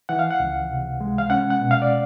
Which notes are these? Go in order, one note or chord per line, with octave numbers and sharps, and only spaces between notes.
E3 F#5
F5
F#5
C#2
C3
G#3
F5
C#4 F#5
F#5
B2
F5
D5